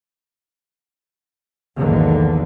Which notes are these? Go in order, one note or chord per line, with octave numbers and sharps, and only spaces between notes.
B1 E2 G#2 D3 D#3 A#3